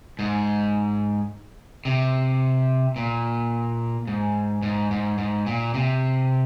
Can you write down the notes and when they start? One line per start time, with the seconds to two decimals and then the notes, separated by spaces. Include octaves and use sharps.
0.19 G#2
1.85 C3
2.96 A#2
4.07 G#2
4.62 G#2
4.91 G#2
5.18 G#2
5.46 A#2
5.74 C3